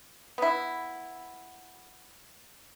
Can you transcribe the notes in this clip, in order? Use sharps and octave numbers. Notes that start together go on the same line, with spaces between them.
B3 E4